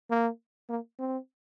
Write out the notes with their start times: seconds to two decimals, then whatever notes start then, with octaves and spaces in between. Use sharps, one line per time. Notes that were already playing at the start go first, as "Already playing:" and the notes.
0.10 A#3
0.70 A#3
0.99 C4